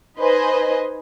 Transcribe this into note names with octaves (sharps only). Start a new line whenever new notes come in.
D#4 B4 C5 D#5 G#5